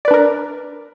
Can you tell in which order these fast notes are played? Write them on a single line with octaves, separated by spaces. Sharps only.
D5 B4 D4 A#4